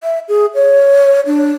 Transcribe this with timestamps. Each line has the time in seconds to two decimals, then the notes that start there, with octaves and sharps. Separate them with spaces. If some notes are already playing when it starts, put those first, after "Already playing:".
0.03 E5
0.28 G#4
0.55 C#5
1.26 D4